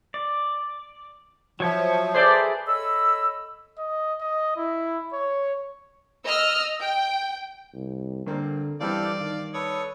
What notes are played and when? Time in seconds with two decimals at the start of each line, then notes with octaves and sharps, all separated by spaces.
0.14 D5
1.60 F3 F#3 C#5 E5
2.15 G#4 A4 B4 C5 D5 E5
2.67 A4 C#5 D#5 B5 E6
3.78 D#5
4.21 D#5
4.57 E4
5.13 C#5
6.25 D#5 E6 F6
6.80 G5
7.74 C2
8.27 G2 D3 A#3 C4
8.81 G2 E3 G3 C4 G4 A4 D5 F5
9.20 D#3 F5
9.54 A4 B4 C#5 D#6